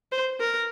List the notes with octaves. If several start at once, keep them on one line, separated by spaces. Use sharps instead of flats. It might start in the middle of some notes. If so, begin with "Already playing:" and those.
C5
A#4